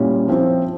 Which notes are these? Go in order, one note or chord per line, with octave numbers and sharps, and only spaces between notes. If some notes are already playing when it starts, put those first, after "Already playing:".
Already playing: A#2 G3 C#4 E4
F3 C4 E4